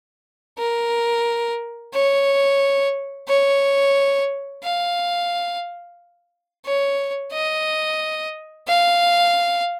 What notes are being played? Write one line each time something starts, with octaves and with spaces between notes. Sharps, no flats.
A#4
C#5
C#5
F5
C#5
D#5
F5